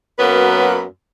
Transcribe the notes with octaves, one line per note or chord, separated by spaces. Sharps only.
F#2 F#3 A#3 B3 B4